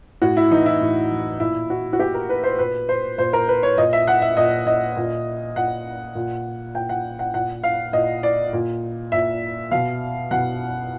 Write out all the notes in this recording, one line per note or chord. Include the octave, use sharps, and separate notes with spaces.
A2 F#4
E4
E3 D#4
E4
A2
E3
A#2 E4
F#4
F#4
A#2 G4
A#4
B4
C5
A#2 B4
C5
A#2 C5
A#4
B4
C#5
A#2 D#5
E5
F#5
E5
A#2 D#5
D#5
A#2
A#2 F#5
A#2
A#2 G5
F#5
F#5
A#2 F#5
F5
A#2 D#5
D5
A#2
A#2 E5
B2 F5
B2 F#5